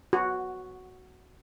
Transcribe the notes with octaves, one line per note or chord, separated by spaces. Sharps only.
F#4